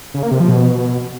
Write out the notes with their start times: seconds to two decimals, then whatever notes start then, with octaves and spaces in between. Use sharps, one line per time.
0.14 C#3
0.23 A#3
0.31 C3
0.40 F3
0.49 B2